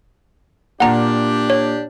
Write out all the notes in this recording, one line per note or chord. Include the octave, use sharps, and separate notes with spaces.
A#2 A#3 D4 G4 F#5 A#5
C#5